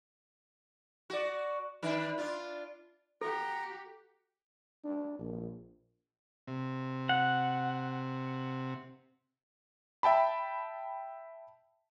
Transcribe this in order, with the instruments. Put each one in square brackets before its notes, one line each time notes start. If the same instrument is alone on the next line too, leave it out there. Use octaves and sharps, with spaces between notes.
[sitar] F#4 D5
D#3 D4 B4
D4 F4
[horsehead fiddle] F#4 G4 [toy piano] A4 [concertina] A#5
[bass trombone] D4
A#1
[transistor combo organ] C3
[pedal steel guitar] F#5
[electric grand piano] E5 G5 A5 B5